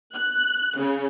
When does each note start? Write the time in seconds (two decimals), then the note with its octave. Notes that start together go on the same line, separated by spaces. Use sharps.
0.14 F#6
0.78 C#3